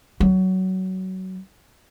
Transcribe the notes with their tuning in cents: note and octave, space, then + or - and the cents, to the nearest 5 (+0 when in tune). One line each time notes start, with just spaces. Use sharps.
F#3 +20